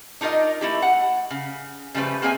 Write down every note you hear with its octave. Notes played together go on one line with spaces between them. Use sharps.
D4 D#4 F4 A#4 D#5
A3 E4 G4
F#5
C#3
C#3 F3 G3 A3 B4
A#3 C4 G#4 C5 E5 G#5